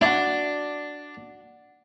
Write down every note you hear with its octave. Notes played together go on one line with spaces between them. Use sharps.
D4 E4 F#4